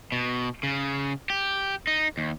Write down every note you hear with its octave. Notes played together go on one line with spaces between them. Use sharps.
B2
C#3
G4
D#4
D#2